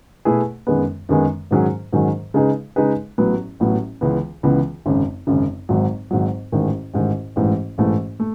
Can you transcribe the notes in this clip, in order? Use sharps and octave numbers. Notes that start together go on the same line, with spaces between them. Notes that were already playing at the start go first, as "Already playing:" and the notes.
B2 A3 E4 G#4 B4
F#2 D#3 G#3 B3
F#2 D#3 G#3 B3
G#2 D#3 F#3 C#4 G#4
G#2 D#3 F#3 C#4 G#4
C#3 G#3 D#4 G#4 B4
C#3 G#3 D#4 G#4 B4
A1 A2 F#3 B3
A1 A2 F#3 B3
C#2 C#3 E3 B3
C#2 C#3 E3 B3
G#1 F#2 C#3
G#1 F#2 C#3
G#1 G#2 F#3
G#1 G#2 F#3
A1 G#2 D#3
A1 G#2 D#3
A1 G#2 E3 A3
A1 G#2 E3 A3
A3